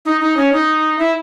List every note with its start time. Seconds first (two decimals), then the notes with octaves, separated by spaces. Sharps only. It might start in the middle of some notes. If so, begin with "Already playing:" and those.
0.05 D#4
0.21 D#4
0.37 C#4
0.52 D#4
0.99 E4